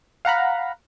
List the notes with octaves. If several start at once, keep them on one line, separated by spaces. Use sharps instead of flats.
F5 F#5 A#5 B5